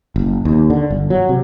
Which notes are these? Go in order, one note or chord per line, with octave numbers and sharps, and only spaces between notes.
F#1
D#2
D3
G1
F#3
C3